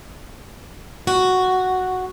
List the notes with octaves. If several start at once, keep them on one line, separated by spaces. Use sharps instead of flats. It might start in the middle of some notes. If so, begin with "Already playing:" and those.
F#4